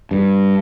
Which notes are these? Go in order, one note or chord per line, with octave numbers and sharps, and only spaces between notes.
G2